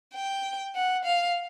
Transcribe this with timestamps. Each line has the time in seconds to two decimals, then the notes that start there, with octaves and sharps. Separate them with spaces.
0.15 G5
0.75 F#5
1.05 F5